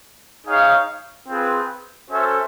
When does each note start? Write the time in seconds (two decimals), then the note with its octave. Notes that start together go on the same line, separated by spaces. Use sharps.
0.46 D#4 G#4 C#5 F5
1.28 C4 F4 G#4 B4
2.10 C#4 F#4 A4 C5 E5